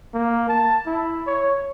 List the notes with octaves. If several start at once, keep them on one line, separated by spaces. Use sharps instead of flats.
A#3
A5
E4
C#5